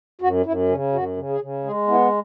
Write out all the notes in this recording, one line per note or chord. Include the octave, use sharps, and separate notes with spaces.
F#2 F#4
F#2 E4
C#3 C#4
F#2 F#4
C#3
G#4
C#3
G#3 G#4
B3 E4